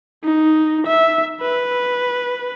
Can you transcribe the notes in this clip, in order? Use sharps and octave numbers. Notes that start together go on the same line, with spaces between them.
D#4
E5
B4